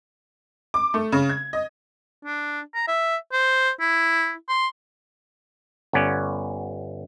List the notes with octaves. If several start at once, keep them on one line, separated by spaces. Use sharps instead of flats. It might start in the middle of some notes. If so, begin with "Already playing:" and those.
D6
A3
C#3
G#6
D#5
D4
A#5
E5
C5
E4
C6
G1 B3 C#4 D5